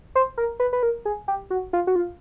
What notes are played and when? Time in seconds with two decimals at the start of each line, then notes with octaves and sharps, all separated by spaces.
0.15 C5
0.38 A#4
0.60 B4
0.73 B4
0.83 A#4
1.05 G#4
1.28 G4
1.50 F#4
1.73 F4
1.87 F#4
1.96 F4